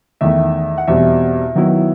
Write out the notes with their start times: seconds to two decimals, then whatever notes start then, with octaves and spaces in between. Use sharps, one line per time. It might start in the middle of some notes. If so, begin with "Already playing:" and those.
0.21 E2 D#3 A3 E5
0.78 F#5
0.88 E2 B2 G3 C4 E5
1.55 D#3 F#3 B3 E4